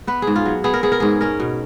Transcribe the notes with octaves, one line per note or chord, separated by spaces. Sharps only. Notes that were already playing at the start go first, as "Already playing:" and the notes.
B3 B4
G#4
G#2
F4
F#3
B3 G#4
A#4
B3 G#4
A#4
G#2 G#4
C#4 A#4
B2